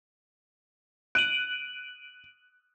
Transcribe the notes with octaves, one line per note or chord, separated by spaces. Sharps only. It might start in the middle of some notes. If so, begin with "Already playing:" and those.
F#6 D7 D#7 F#7